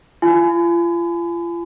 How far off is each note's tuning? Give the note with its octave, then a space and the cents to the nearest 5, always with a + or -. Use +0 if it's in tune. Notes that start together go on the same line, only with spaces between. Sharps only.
F4 -35 G#5 +20 B5 +40